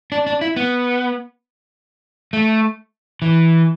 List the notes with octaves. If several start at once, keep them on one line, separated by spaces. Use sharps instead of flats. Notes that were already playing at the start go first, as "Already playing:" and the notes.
D4
D4
E4
B3
A3
E3